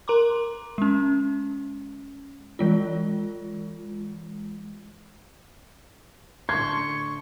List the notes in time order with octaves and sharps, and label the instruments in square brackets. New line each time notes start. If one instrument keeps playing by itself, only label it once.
[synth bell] A#4 A#5 C6 D6
G#3 C#4
E3 G#3 F4
[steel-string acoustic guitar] A2 D3 [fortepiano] C6 [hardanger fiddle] C#6 [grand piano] G#6